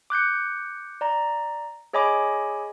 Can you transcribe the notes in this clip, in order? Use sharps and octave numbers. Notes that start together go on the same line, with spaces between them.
D6 F#6 G6 C#7
D5 A#5
G#4 C#5 D#5 G#5 B5 D6